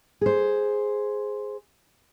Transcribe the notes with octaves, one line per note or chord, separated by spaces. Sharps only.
G#4 C5